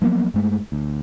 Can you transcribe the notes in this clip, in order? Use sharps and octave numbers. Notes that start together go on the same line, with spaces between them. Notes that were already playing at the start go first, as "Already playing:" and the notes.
F3 F#3 A#3 B3
G2 G#3 A3
D2